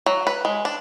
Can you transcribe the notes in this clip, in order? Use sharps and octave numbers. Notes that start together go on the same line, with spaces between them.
F#3
B4
G#3
D4